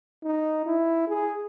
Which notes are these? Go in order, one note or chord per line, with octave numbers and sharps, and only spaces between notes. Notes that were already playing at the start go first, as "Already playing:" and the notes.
D#4
E4
G#4